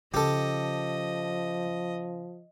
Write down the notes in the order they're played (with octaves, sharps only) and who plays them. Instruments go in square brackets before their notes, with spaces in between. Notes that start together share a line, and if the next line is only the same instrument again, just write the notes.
[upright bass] C#3 [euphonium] F3 [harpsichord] G4 A4 [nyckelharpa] D#5